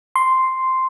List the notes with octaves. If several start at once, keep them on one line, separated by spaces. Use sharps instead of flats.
C6